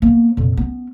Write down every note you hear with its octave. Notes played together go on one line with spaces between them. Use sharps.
A#3 B3
F2 A#2
B3 C#4